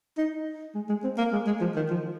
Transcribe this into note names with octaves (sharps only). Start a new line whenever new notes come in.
D#4
G#3
G#3
C4
A#3
G#3
G#3
F3
D#3
F3